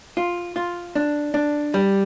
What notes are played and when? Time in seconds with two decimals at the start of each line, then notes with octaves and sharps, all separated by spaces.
0.17 F4
0.56 F4
0.95 D4
1.34 D4
1.74 G3